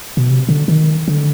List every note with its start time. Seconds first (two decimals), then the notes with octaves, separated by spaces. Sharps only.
0.17 B2
0.29 C3
0.49 D3
0.68 D#3
1.08 D3